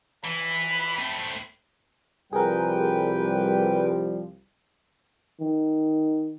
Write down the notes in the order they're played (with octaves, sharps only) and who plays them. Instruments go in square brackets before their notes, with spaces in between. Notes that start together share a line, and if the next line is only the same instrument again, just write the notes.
[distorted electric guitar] E3 [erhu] B5
[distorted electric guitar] A3 C4
[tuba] C2 [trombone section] F3 G3 [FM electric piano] G#4 A#4 [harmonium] B4 G5
[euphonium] D#3